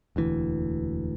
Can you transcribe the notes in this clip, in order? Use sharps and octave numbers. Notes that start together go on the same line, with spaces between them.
E1 D2 E3